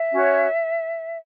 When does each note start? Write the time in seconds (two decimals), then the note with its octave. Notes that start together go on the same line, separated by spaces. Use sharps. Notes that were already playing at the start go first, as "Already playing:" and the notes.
Already playing: E5
0.10 C#4 F#4 C#5